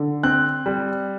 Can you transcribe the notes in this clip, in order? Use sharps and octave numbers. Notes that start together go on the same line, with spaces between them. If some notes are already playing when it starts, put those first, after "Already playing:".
Already playing: D3
C4 F#6
G3